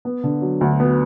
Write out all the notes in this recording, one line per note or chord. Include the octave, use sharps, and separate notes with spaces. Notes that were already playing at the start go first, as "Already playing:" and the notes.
B3
D3
F#3
D2
B3